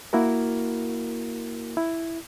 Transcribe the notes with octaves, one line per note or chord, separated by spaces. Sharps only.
A#3 E4 F#4 A#4
E4